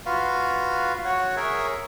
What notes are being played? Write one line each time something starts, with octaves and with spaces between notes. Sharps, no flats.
F4 F#4 B4 F5
F#4 C#5 F#5
G#4 A#4 C#5 E5